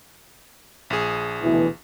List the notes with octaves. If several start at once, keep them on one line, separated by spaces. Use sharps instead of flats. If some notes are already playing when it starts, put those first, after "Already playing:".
A#1 G#4
D2 B2 E3